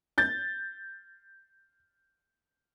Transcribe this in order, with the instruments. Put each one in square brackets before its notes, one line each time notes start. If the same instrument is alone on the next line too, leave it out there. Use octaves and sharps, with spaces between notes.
[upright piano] G6 A6